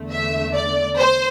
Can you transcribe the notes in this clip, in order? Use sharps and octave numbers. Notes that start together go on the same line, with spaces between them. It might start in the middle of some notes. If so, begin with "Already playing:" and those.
Already playing: E2 D3 A3
E5
D5
C5